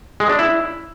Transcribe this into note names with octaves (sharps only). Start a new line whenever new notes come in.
G#3
D4
E4